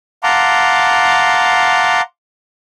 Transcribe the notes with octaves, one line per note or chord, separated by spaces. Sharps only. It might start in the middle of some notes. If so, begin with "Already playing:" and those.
F5 F#5 A5 A#5 C6 D6